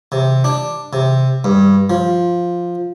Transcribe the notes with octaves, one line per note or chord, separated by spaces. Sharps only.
C3
D4
C3
G2
F3